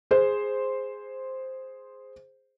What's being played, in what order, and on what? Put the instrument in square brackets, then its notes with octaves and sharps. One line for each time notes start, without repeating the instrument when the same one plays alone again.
[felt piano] G#4 C5